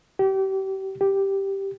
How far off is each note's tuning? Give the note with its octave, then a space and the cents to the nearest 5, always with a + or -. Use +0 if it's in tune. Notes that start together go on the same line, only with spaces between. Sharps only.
G4 -30
G4 +0